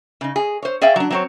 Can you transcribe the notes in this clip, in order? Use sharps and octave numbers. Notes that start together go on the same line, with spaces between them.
C#3 D#4
G#4
C5 C#5
G#4 D5 E5 F5 G5
F#3 D4
F#3 C4 C#5